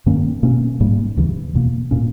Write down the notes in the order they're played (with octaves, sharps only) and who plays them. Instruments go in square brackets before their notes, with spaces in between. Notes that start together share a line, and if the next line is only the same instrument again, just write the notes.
[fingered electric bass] G2 D#3 A#3 C#4
B2 A#3 C#4
G#2 G3 A#3
D#2 C#3 E3
E2 B2 A#3
A#2 A#3 C#4